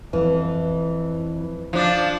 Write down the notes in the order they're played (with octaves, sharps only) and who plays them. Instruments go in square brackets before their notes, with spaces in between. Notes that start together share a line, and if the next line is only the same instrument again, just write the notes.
[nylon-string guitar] F2 E3
[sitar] F3 D4